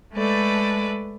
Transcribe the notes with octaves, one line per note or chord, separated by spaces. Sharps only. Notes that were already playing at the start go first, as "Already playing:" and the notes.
G#3 A3 A4 B4 D5